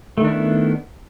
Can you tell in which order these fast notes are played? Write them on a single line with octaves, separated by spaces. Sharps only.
A3 D#3 D4 E4 B3